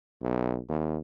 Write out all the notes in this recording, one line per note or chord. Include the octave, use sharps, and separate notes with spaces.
B1
D#2